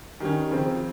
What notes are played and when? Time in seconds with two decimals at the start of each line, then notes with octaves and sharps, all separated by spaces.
0.20 D#3 G3 C#4
0.51 C#3 F3 C4